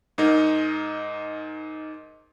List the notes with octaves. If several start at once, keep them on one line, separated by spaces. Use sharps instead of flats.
G#2 D#4 A#4